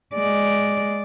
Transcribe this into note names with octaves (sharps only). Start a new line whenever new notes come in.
G#3 D5